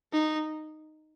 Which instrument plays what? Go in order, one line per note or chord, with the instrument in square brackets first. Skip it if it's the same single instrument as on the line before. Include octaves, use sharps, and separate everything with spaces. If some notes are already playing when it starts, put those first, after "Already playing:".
[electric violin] D#4